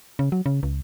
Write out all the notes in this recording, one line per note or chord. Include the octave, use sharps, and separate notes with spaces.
C#3
F#3
C#3
C#2